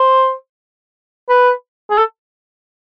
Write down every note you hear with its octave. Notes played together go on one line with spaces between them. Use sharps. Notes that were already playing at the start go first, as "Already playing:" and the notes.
Already playing: C5
B4
G#4
A4